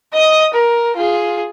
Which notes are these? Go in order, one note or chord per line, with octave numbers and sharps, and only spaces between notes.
D#5 D#6
A#4
F4 G#4